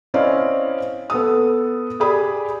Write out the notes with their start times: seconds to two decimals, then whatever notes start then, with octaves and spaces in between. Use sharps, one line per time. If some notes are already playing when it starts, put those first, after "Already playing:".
0.14 C4 C#4 E4 D5 D#5 F5
1.10 B3 A4 D#6
2.00 G4 G#4 D5 G#5 B5 D#6